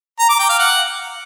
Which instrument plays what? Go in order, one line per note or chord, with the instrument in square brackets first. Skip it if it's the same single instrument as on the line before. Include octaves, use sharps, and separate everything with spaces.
[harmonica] A#5
D6
G5
F5
F#5